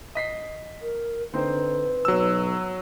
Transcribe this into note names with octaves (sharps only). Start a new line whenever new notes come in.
D#5 B6 C7
A#4
D3 C4 D#4 B4 C5
B1 F#3 E6